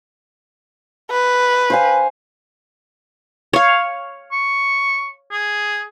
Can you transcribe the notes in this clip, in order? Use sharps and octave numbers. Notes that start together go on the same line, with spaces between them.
B4
C5 F5 G#5
C#5 F5
C#6
G#4